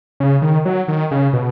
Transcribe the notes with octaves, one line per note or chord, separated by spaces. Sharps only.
C#3
D#3
F#3
D#3
C#3
B2